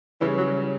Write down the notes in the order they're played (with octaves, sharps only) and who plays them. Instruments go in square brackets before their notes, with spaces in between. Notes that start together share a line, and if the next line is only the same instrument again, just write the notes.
[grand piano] C#3 G3 C#4 [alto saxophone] E3
[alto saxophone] F#3